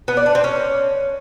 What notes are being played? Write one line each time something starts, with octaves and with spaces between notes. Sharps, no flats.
B3
D5
D4
C4
C#4